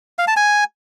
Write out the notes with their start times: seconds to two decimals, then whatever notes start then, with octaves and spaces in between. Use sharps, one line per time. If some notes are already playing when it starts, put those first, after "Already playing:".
0.19 F5
0.28 A5
0.37 G#5